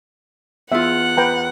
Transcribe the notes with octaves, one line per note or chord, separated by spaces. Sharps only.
E2 F4 E5 F#5
B4 G5 A#5